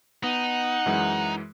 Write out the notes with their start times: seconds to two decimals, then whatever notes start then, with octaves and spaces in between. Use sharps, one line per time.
0.24 B3 D#4 F#5 D#7
0.86 F#2 E3 G#3